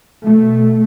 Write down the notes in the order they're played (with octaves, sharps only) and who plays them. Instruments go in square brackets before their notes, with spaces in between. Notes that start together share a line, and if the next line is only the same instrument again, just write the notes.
[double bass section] B2 A3